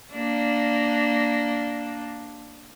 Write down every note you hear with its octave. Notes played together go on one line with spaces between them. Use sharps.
A#3 D4